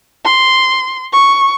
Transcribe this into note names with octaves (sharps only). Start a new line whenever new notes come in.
C6
C#6